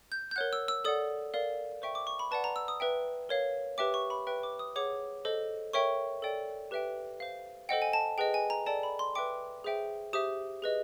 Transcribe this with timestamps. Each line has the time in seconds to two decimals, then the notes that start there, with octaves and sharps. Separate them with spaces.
0.12 G6
0.31 G6
0.36 A#4 C#5 F#5 F#6
0.53 E6
0.68 E6
0.85 A4 D5 F#5 D#6
1.34 A#4 D5 F5
1.82 C5 E5 G5 C#6
1.95 D6
2.07 C#6
2.19 B5
2.31 B4 D5 F#5 A5
2.44 A#5
2.56 E6
2.68 D#6
2.80 B4 E5 G5
3.29 A#4 C#5 F5
3.78 G4 B4 E5 G5 D6
3.94 C#6
4.10 B5
4.27 B4 E5 G5
4.43 D6
4.59 D#6
4.76 G#4 C#5 F#5 D6
5.25 A4 C5 D#5
5.73 A#4 C#5 E5 G5 C#6
6.22 A4 D5 G5
6.71 G4 B4 E5 G5
7.20 C5 F5
7.69 A4 C5 D#5 F#5 G5
7.82 G#5
7.93 A5
8.18 G#4 B4 D#5 G5
8.34 G#5
8.50 A#5
8.66 A4 D5 G5 A5
8.83 B5
8.99 C6
9.15 B4 E5 G5 D6
9.64 G#4 C5 E5 G5
10.13 G4 C5 E5 D#6
10.62 G#4 B4 D#5